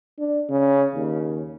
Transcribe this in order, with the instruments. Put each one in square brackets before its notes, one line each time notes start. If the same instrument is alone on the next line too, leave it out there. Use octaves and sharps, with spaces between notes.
[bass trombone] D4
C#3
D#2